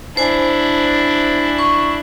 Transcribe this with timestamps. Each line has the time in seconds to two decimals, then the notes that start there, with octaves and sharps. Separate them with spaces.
0.17 D4 E4 C5 G#5
1.59 C#6